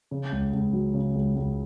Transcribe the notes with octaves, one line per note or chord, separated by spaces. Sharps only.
C#3
C#2
C#2
F#3
C#3
C#2
C#2